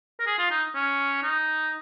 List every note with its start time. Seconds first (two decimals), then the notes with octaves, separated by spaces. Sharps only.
0.20 A#4
0.26 G#4
0.39 F4
0.50 D#4
0.75 C#4
1.23 D#4